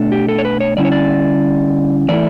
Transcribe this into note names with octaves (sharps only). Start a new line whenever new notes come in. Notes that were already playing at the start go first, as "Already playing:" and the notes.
Already playing: B2 A3 D4
G4
A4
C#5
B4
C#5
D3 G3 C#4 E4 D5
C#5
D5
A2 E3 A3 E4 D5